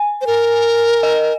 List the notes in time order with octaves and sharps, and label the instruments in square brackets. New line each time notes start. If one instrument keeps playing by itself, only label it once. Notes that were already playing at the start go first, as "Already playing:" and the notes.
Already playing: [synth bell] G#5
[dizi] C5
A#4
[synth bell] D#5